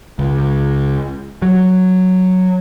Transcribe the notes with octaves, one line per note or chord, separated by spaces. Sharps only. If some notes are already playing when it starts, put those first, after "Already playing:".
C#2
F#3